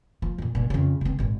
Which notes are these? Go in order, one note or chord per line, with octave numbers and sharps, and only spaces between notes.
F3
F2 A#2
G2 A#2
F2 C#3
C#3 C4
G#1 A#2